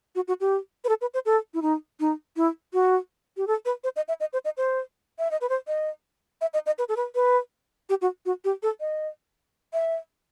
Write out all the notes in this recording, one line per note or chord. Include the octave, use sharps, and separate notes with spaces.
F#4
F#4
G4
B4
A4
B4
C5
A4
E4
D#4
D#4
E4
F#4
G4
A4
B4
C5
D#5
E5
D#5
C5
D#5
C5
E5
D#5
B4
C5
D#5
E5
D#5
D#5
B4
A4
B4
B4
G4
F#4
F#4
G4
A4
D#5
E5